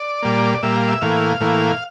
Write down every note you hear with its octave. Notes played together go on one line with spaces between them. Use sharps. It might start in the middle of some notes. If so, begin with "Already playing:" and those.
Already playing: D5
A#2 G3 A#3
D5
A#2 G3 A#3 E5
F5
E5
A2 E3 A#3 F5
A2 E3 A#3